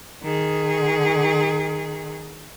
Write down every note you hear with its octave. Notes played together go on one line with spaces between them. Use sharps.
D#3 G#4